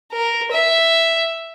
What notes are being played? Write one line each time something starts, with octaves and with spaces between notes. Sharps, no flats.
A#4
E5